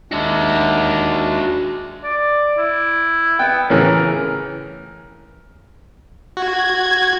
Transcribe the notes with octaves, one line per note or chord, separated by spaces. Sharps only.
D#2 G#3 D4 F#4 E5
D5
E4
B3 G5
A2 C#3 E3 A#4
F#4 G#6